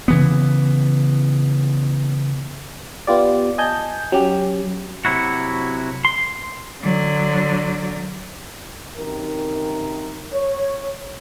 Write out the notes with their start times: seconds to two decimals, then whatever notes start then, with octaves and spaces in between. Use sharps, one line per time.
0.08 C#3 E3 B3
3.07 B3 F4 G4 D5
3.58 D#5 G#5 A5 G6
4.12 F#3 C#4 G4
5.05 C3 F#3 E4 F#4
6.05 C6
6.83 D3 F#3
8.97 F#2 C3 D#3 A#4
10.33 C#5